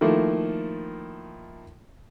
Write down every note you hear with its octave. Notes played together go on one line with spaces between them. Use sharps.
D#3 F3 A3 A#3 E4